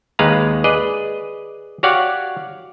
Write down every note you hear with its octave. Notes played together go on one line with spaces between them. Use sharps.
D#2 G#3 B4 F5 A#5
G#4 B4 D5 D#5
F#4 G4 C#5 D5 F5 F#5